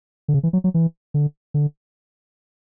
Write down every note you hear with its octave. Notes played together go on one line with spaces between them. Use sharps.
D3
C#3
E3
F#3
F#3
E3
D3
D3